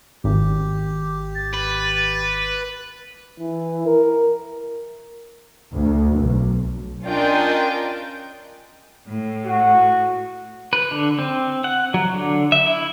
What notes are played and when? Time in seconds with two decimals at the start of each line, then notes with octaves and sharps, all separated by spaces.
0.24 G#1 G4
1.35 A6
1.54 B4
3.39 E3
3.86 A#4
5.73 D2
6.20 B1
7.03 C#4 D4 F4 A#4 D#5 G5
9.08 A2
9.46 F#4
10.73 B4
10.91 D3
11.19 C4
11.64 F#5
11.94 F#3
12.14 D3
12.52 E5
12.66 E4